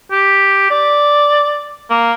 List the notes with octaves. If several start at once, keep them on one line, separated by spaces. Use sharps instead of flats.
G4
D5
A#3